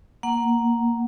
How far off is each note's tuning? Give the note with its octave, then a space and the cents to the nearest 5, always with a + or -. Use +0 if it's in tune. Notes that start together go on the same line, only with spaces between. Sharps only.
A#3 +0 F#5 +0